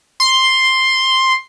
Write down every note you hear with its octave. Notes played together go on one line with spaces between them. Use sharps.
C6